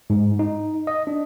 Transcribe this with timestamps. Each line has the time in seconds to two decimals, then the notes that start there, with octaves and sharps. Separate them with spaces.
0.10 G#2
0.39 D#4
0.87 D#5
1.07 D4